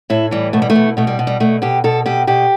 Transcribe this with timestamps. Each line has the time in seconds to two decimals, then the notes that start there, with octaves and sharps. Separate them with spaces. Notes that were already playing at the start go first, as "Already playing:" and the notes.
0.10 A2 E4
0.31 E3 G3
0.53 B2 A3
0.62 G3
0.70 A3
0.75 B2
0.97 B2 A3
1.07 G3
1.19 B2
1.27 G3
1.40 B2 A3
1.62 B2 G4
1.84 B2 A4
2.06 B2 G4
2.27 B2 G4